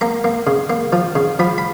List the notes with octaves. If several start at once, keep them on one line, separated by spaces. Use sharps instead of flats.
A#3 A#5
A#3
C#3
A#3
F3
C#3
F3 B5
B5